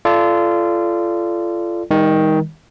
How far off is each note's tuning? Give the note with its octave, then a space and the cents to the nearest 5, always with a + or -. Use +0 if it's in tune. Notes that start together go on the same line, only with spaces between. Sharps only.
F4 -25 A4 -10 D5 +0
D#3 +15 G3 +45